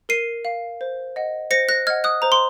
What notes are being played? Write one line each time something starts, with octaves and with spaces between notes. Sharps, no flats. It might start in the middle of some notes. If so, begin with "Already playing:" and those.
A#4 C7 D#7
F5
C5
D#5 F#5
C5 A#6 C#7
F#6 A#6
D#5 F#5 F6 G#6
D#6 F#6
C5 A#5
C6